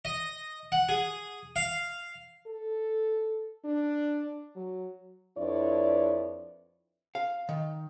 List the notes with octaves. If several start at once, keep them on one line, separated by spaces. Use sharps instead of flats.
D#5
F#5
G#4
F5
A4
D4
F#3
F2 D4 E4 B4 C#5 D5
F5
D#3